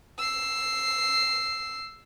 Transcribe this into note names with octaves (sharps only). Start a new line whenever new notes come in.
E6 C7